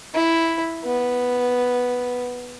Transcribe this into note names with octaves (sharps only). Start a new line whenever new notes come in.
E4
B3